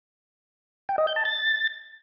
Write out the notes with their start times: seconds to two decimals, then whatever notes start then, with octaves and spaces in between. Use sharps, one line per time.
0.89 G5
0.98 D#5
1.07 G6
1.16 A5
1.25 A6